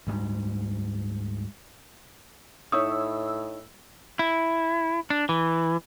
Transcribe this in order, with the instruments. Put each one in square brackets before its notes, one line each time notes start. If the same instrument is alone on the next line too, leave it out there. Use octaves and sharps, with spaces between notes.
[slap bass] D2 G#2 G3
[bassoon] A2 [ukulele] D#4 E4 C#5 [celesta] D#6 [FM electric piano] E6
[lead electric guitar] E4
D4
E3